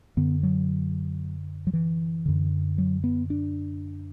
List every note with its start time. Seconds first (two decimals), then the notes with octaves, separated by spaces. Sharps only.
0.17 F#2 D3 B3
0.43 F#3
1.67 F#3
1.73 E3
2.26 F#2 D3
2.78 F#3
3.04 B3
3.30 D4